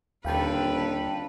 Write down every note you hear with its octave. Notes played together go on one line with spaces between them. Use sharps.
D#1 D#2 D3 D#3 B4 F5 G5 A5